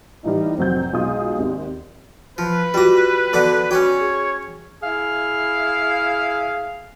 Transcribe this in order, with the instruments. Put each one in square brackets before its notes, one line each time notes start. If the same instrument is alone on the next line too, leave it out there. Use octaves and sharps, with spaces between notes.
[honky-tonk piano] A2 E3 G3 [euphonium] D#4
[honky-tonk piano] F1 F#3 G6 [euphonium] C4
[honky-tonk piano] B1 F4 D#6 [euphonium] G#3
[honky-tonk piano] G#1 D#2
[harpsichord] F3 [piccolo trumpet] B4
[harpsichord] G3 A#5 [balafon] F4 F#4
[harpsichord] D3 B3 D6 [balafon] F#4 D5
[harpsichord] C#4 D5 G5 [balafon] F#4 [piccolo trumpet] C#5
[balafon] G#4
[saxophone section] E4 G#4 F5